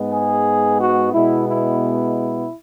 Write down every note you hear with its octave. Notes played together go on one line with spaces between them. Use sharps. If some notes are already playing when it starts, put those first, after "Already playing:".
Already playing: G#2 G#3 B3
G#4
F#4
B2 G#3 B3 E4
E4